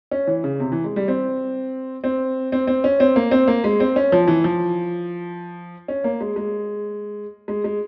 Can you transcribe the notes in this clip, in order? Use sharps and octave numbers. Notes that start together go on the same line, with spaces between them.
C#4
E3
C#3
C3
E3
G#3
G3
C4
C4
C4
C4
C#4
C4
A#3
C4
A#3
G#3
C4
C#4
F3
E3
F3
C#4
A#3
G#3
G#3
G#3
G#3